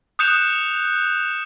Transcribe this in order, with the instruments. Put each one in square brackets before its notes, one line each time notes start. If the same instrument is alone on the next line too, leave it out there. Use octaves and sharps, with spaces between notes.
[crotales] D#6 F#6 G6 C#7 E7 F7